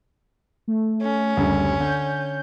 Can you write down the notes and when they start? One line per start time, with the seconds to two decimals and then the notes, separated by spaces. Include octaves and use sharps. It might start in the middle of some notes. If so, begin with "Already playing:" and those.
0.68 A3
1.02 C#4
1.37 F#1 D2 G3
1.80 D3 G6